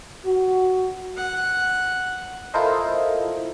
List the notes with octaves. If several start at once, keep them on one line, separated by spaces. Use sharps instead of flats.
F#4
F#5
E4 F4 A4 A#4 C5 D#5